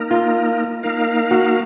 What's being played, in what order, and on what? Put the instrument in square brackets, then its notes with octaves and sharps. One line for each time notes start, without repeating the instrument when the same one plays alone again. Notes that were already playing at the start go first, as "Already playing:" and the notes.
Already playing: [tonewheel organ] A#3 D#4 A#4
[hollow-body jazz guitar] F4
[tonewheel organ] A#3 D#4 A#4 F5
[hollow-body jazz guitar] F#4